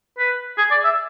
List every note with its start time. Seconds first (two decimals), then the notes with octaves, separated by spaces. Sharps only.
0.19 B4
0.58 G#4
0.71 D5
0.84 E5